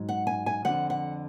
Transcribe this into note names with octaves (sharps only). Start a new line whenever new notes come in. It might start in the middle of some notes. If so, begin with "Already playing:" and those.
Already playing: G#2 F#3
F#5
G#5
G#5
F2 D3 F3 F#5
F#5